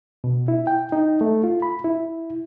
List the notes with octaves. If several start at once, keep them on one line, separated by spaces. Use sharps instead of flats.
B2
E4
G5
D#4
A3
F4
B5
E4